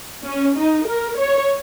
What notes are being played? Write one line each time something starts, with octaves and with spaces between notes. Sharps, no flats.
C#4
D#4
A#4
C#5